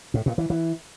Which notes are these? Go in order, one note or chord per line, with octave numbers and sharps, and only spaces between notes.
A2
A#2
E3
E3